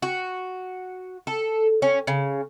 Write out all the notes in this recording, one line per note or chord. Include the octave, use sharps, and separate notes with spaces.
F#4
A4
C#4
C#3